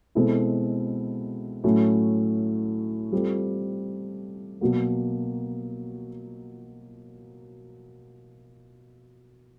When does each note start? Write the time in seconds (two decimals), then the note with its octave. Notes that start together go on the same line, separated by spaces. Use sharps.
0.15 B2 G#3 C4 E4 A4
1.64 A2 F#3 A3 C#4
3.12 G3 C4 F4 A4
4.61 B2 F#3 A#3